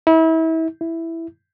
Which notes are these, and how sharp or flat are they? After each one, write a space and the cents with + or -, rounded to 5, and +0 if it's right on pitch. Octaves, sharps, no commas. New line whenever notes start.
E4 -35
E4 +0